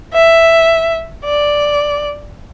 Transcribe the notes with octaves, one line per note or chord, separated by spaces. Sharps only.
E5
D5